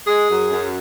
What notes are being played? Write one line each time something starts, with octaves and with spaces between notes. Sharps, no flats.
G#3 G#4
F#2
F#2